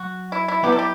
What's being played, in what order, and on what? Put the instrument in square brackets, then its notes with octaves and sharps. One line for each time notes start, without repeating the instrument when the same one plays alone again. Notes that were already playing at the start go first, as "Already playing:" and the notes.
Already playing: [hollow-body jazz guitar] F#3 [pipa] F#4
[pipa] E4
E4
[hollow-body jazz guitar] F#3 B3 E4 B4 D5 [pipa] G4
[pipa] A4
G4